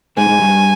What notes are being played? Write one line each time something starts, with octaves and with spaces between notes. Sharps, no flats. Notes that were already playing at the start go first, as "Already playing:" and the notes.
G#2 G#3 G#5
G#2 G#3
G2 G3